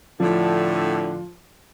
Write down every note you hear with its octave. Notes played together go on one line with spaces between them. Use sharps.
A2 D3 F3